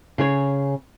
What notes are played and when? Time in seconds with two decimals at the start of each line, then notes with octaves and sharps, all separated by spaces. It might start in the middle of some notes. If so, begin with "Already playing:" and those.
0.18 C#3 G#4 C#5